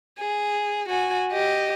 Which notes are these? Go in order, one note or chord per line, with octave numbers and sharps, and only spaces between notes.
G#4
F#4 G#5
G4 D#5